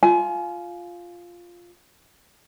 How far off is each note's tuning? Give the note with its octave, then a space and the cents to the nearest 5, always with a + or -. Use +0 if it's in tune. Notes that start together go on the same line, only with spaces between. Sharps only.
F4 +0 G#5 +25